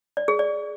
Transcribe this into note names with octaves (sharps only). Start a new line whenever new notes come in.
D5
G#4
D5